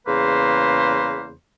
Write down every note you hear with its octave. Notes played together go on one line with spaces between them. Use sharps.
E2 C#3 A#3 B4 C5